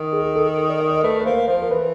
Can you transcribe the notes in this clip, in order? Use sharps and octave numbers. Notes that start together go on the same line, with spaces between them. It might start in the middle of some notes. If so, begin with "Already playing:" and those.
Already playing: D#3
G#4
G#4
A4
D5
D#5
D5
A3 B4
B4
A#3 C5
F3 C5
A#4
E3 B4